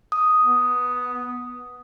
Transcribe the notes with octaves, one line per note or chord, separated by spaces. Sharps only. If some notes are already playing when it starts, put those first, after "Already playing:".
D#6
B3